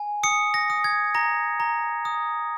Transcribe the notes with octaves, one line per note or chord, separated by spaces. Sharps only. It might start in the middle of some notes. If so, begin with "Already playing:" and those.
Already playing: G#5
D#6 C#7
A#6
D#6
G#6
A#5 A#6
A#5
D#6